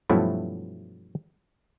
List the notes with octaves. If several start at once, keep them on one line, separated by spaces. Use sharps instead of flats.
G2 B2 F3 F#3 A3 E4